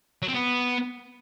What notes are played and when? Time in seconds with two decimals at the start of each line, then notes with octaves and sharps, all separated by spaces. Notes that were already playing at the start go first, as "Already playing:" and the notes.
0.22 F#3
0.28 C4
0.34 B3